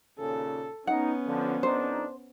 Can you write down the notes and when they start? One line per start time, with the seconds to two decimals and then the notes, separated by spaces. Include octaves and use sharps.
0.19 D#2 A#2 C#3 A4
0.87 B3 C#4 D#4 F#5
1.26 D3 F3
1.63 F2 D4 D#4 C5